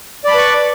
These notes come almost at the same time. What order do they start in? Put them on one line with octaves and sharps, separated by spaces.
D5 B5 A5 B4 C#6